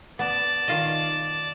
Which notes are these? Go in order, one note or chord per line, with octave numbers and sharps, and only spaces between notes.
B3 D5 A5
D#3 F4 D#5